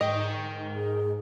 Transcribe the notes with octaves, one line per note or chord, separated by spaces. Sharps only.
G#2 A#4 D#5 G5
G#4